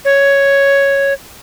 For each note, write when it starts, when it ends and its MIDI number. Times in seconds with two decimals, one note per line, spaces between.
0.05 1.13 73